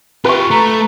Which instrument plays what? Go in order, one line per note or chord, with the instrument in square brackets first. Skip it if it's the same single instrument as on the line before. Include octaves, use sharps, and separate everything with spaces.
[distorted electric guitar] F4 G4 [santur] B4 C#6
[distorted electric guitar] A3 [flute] A#5